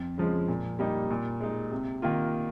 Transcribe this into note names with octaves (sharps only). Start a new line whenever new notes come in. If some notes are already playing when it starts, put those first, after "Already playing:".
Already playing: F2
C#3 F3 G#3
A#2
G3 A#3 D#4
A#2
G#3 D#4
C3
D#3 A#3 F4